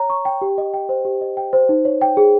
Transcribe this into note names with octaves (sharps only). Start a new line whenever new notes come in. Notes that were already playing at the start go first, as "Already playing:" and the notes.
Already playing: C#5 A#5
C#6
G5
G4
D#5
G5
C5
G4
D#5
G5
C5
D#4
C#5
G5
G#4